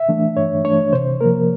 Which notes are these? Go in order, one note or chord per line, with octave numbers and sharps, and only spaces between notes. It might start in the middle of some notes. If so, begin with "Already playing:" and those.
Already playing: E5
E3 A3 D4
G2 C#5
E3 A3 D4 C#5
C3 C5
F3 A#3 A#4